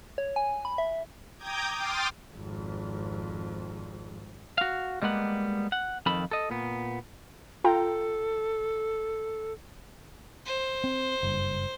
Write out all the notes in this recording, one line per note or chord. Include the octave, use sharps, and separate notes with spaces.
C#5
G#5
B5
E5
G5 A#5 D6 D#6 G6 G#6
G5 C6 D6 D#6 F6 A6
G#1 F2
F#4 F5
G3 G#3 A#3 B3 F#5
F#5
F2 D#3 A4 B5
A4 D#5
A#2 B3
F4 A4 G5 A#5
C5
C4
F#1 G2